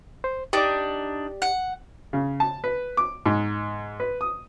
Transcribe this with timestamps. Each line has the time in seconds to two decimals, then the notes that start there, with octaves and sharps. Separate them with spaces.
0.24 C5
0.53 D4 D#4 G4 D5
1.42 F#5
2.13 C#3
2.40 A5
2.64 B4
2.97 D6
3.26 G#2
4.00 B4
4.21 D#6